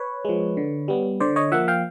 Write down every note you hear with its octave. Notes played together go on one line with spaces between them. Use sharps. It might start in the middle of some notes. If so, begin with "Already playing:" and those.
Already playing: B4 C#5
F3 G#3
D3
G3 B3
D3 C5 D5
C#5 D#5
F3 A#3 E5 F#5
F5 G5